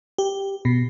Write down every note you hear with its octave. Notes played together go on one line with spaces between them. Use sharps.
G4
B2